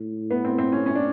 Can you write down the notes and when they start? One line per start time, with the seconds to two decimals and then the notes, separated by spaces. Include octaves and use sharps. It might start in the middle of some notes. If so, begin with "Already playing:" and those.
Already playing: A2
0.31 B3
0.45 C4
0.58 C4
0.72 C#4
0.86 C#4
0.95 D4